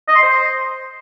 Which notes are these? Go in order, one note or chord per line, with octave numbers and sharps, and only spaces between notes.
D#5
C6
C5